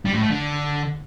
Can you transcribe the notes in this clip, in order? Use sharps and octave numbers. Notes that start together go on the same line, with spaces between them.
G3
A2
A3
D3